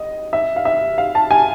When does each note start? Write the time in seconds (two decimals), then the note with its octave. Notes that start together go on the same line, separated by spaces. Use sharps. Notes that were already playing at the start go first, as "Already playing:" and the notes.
Already playing: D#5
0.33 E5
0.56 F5
0.65 E5
0.98 F5
1.15 A5
1.31 G#5